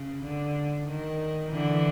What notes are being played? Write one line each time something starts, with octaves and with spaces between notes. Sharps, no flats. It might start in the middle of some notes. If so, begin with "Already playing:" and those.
Already playing: C#3
D3
D#3
D3 E3